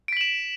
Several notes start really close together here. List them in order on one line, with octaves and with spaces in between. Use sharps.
D7 B6 F#7 E7